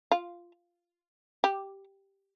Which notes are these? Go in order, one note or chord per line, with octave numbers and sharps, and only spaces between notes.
F4
G4